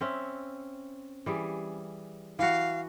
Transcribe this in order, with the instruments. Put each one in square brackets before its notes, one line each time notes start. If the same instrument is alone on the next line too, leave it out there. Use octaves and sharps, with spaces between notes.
[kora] C4 C#4 E5
E3 G3 G#4
[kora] E3 F#4 [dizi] F5